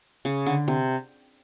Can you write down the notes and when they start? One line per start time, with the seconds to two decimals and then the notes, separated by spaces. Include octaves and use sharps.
0.25 C#3
0.46 D3
0.68 C3